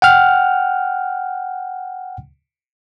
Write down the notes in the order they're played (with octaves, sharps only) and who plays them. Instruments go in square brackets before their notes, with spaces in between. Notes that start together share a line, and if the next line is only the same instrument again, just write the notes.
[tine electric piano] F#5 G5 F6